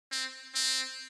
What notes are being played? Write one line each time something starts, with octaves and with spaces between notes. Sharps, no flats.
C4
C4